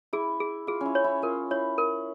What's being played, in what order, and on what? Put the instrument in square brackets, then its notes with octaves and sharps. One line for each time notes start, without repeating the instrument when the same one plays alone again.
[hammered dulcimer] E4 [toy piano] G#4
[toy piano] G#4
[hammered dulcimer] F4 [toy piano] G#4
[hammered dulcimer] C#4 E4
[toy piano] C#5
[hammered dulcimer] E4
[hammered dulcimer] F4 [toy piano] A#4
[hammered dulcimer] E4 [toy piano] C#5
[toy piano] A#4